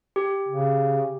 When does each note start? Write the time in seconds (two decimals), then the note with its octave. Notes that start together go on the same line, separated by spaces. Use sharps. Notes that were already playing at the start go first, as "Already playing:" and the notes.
0.16 G4
0.48 C#3